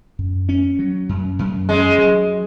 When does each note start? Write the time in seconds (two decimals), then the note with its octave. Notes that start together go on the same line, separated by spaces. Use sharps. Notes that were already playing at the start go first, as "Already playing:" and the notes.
0.19 F#2
0.49 C#4
0.79 F#3
1.09 F#2
1.39 F#2
1.69 G#3 C#4
1.98 F#3